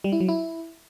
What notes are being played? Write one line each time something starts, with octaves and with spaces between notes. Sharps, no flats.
G3
E4
F#3
E4